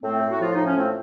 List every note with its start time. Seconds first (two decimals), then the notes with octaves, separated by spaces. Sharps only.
0.02 A2 A3 C4
0.21 A2
0.30 F#4
0.40 F3 F4
0.53 A2 D#4
0.65 C#4
0.76 F3 A3 C4